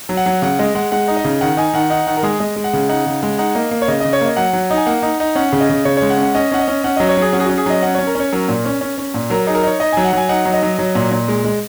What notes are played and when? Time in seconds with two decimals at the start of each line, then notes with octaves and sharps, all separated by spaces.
0.09 F#3
0.17 F#5
0.26 F#3
0.42 C#3 F#5
0.59 G#3 D#5
0.75 G#3 F#5
0.92 G#3 F#5
1.08 D#4
1.17 D#5
1.25 C#3
1.41 D#3 F#5
1.57 D#4 G#5
1.74 D#3 F#5
1.90 D#4 F#5
2.07 D#3 F#5
2.17 A#4
2.23 G#3 G#4
2.40 G#3 D#5
2.56 G#3
2.64 F#5
2.73 C#3
2.89 D#4 F#5
3.06 C#3
3.23 G#3
3.38 D#4 F#5
3.55 A#3 D#5
3.71 A#3
3.82 C#5
3.88 C#3 D#5
4.00 C#3 D#5
4.13 C#5
4.21 A#3 D#5
4.37 F#3 F#5
4.53 F#3
4.70 D#4
4.77 G#5
4.86 A#3 F#5
5.03 D#4
5.20 D#4
5.35 C#4 F#5
5.52 C#3
5.60 D#5
5.69 C#3
5.85 C#3 C#5
5.97 G#3 C#5
6.10 F#5
6.18 C#4
6.23 F#5
6.35 C#4 D#5
6.52 C#4 F#5
6.59 D#5
6.68 C#4
6.84 C#4 F#5
6.97 F#3 D#5
7.09 C#5
7.17 F#3 G#4
7.33 C#4 F#4
7.40 G#4
7.46 C#4 F#4
7.58 G#4
7.66 F#3 D#5
7.82 C#4 F#5
7.95 C#4 C#5
8.07 A#4
8.15 C#4 C#5
8.32 F#3 A#4
8.48 A#2
8.65 C#4
8.81 C#4
8.98 C#4
9.14 A#2
9.30 F#3 A#4
9.47 D#4 G#4
9.55 A#4
9.63 D#4 C#5
9.80 D#4 D#5
9.93 F#3 G#5
10.04 F#5
10.13 F#3 G#5
10.29 D#4 F#5
10.45 F#3
10.54 D#5
10.63 F#3
10.79 F#3
10.95 A#2
11.12 A#2
11.28 G#3
11.45 G#3